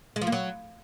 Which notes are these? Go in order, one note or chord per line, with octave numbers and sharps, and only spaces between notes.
G#3
F3
A#3
F#3